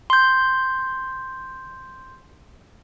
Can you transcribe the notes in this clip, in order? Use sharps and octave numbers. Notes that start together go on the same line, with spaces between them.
C6 G6